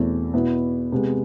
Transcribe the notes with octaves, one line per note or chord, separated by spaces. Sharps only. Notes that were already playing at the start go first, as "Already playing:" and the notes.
Already playing: E2 B2 A3 C4 E4
B2 B3 E4
C3 G#3 B3